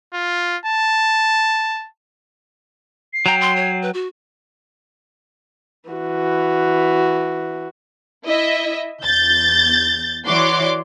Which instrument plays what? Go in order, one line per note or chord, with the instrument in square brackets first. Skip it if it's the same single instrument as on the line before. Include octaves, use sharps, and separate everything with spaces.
[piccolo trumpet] F4
A5
[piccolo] C7
[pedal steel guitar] F#3 G5 [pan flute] A#5
[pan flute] C6
C#5
B4
F#4
[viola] E3 F#4
[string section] E4 D#5 E5
E2 G6 A6
E3 F#4 C#5 D5 C6 D6